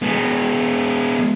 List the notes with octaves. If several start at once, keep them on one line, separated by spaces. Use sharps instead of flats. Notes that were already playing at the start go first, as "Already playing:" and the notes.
G#3 B3